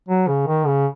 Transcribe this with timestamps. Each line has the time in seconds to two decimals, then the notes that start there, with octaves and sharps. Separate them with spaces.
0.09 F#3
0.27 C#3
0.47 D#3
0.66 C#3